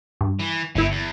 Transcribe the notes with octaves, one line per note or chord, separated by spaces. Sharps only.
G2
E3
G1 A2 E4
E2